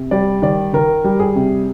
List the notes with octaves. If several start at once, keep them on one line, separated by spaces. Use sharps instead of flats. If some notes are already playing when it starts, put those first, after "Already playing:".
Already playing: C3
G3 D5
D#3 D5
D#3 A#4
G3
G#4
C3